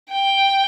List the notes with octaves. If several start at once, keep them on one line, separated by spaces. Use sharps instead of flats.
G5